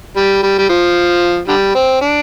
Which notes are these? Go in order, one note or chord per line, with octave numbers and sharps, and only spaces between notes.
G3
G3
G3
F3
D3 G3
C4
D4